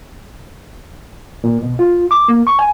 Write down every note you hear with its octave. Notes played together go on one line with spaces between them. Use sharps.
A#2
B2
F4
D6
A#3
C#6
G#5